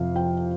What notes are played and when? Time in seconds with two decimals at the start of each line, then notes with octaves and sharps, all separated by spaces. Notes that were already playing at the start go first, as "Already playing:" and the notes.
Already playing: F2 C3 F5
0.15 F3 G5